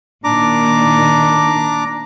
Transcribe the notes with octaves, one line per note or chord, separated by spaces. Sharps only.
A#2 D#3 D4 A#5 D6